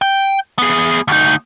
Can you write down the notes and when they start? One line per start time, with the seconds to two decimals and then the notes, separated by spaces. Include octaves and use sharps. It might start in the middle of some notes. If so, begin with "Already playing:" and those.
0.02 G5
0.58 B3 G#4
1.08 D2 D#4